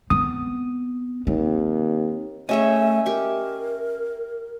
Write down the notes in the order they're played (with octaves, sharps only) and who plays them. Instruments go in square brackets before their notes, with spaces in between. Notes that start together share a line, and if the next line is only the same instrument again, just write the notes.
[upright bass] B3 C4 [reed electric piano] D#6
[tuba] D#2 [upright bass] C4
[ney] A3 [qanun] C#4 G#4 C#5 [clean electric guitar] D#5 E5
[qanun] G4 C#6 [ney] A#4